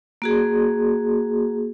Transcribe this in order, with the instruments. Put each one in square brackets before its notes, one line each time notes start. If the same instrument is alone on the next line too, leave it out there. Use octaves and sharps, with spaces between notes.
[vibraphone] A#3 F#4 G#4